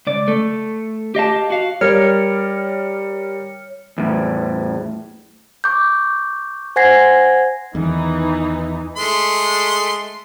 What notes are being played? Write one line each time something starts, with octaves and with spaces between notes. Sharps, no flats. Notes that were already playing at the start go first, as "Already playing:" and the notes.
C#2 D5
A3
G4 D#5 F5 A5
F#4 F5
G3 A#4 C#5 F6 C#7
E2 A2
C#6 D6 G6
C5 F#5 G#5 G#6 A#6 C7
E2 D#3 E3 D#4
G#3 A3 C6